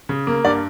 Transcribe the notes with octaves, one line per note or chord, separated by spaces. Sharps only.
C#3
A#3
G2 D5